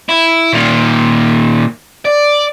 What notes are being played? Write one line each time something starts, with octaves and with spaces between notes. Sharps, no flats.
E4
A#2 D#3
D5